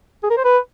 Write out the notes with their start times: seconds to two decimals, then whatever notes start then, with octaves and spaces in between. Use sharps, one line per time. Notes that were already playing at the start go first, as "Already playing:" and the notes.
0.23 G#4
0.30 A#4
0.37 C5
0.44 B4